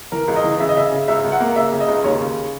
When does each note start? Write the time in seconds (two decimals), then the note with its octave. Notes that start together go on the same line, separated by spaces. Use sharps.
0.12 E3 A#4
0.28 C#2
0.36 D#5
0.44 E3
0.60 C#3 E5
0.69 D#5
0.76 C#3 E5
0.92 C#3
1.08 C#2 E5
1.24 C#2
1.32 F#5
1.40 A#3
1.56 C#3 E5
1.72 C#3
1.80 D#5
1.88 C#2
2.04 D#2 C#5
2.20 C#3